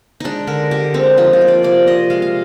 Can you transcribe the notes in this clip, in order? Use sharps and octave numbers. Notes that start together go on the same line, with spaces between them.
G#3 D4 D#4
D3 A#4
D3 G4
G#3 C4
F3 D#4
F4
A#3
D5
C3 D5
C3 D#5
G#3 F5
F5